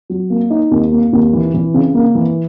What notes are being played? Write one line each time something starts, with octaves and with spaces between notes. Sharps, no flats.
F#3
A#3
D#4
D#2
A#3
D#2
E3
E3
C#3
A#3
E3